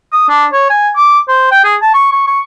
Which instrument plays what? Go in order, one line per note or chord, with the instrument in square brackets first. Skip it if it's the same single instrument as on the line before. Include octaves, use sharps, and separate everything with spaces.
[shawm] D#6
D4
C#5
G#5
D6
C5
G5
G#4
A5
C#6
C#6
C#6